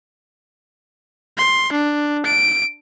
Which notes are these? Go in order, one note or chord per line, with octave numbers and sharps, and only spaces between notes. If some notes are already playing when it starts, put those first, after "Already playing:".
C6
D4
D7